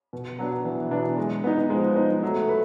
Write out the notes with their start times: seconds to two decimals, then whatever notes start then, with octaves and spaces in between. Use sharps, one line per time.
0.13 B2
0.39 F#3 B3 D4
0.65 B2 E3
0.91 F#3 B3 D4
1.18 G#3
1.44 B3 D#4
1.70 F3 G#3
1.96 B3 D#4
2.23 F#3 A3
2.49 B4